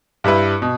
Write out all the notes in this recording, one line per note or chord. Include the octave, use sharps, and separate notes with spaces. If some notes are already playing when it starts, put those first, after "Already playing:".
G2 G3 E4 B4
B2